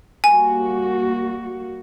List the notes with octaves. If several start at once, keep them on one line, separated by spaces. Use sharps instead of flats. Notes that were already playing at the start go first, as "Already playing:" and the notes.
G3 A#3 F#4 G#5